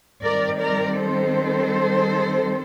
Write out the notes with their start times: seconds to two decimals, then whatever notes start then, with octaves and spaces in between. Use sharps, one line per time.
0.23 D#3 G3 C4 A#4 D5
0.59 A#4 D5
0.97 A4 C5